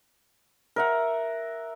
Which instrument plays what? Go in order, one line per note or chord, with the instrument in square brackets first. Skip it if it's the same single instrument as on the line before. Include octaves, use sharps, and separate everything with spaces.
[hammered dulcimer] A#4 E5 F#5